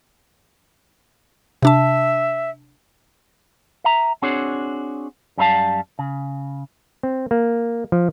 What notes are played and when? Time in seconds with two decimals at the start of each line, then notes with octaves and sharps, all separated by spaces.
1.63 C3 D4 E5 A5
3.84 E5 A#5
4.22 C4 D4 F#4 G#4 C#5
5.38 F#2 G3 D4 E4 F5 A5
5.99 C#3
7.03 C4
7.31 A#3
7.92 F3